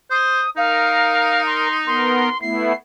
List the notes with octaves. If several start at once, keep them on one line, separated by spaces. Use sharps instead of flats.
C5 D#6
D#4 A#4 F5
C6
B3 A#4 C6
A3 B3 E4 C7